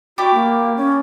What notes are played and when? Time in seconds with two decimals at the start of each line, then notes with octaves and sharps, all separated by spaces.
0.18 E4 F#4 G4 D5
0.34 A#3
0.76 C#4